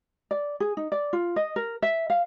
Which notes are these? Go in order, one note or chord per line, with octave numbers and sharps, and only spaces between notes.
D5
G#4
D#4
D5
F4
D#5
A#4
E5
F5